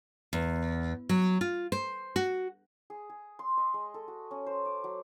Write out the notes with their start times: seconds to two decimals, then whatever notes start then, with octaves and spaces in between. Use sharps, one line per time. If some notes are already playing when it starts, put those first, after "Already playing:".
0.33 E2
1.09 F#3
1.41 F4
1.72 C5
2.16 F#4
2.90 G#4
3.09 G#4
3.39 C6
3.57 D#5
3.74 G#3
3.94 A4
4.08 F#4
4.31 C#4
4.46 C5
4.65 D6
4.84 F#3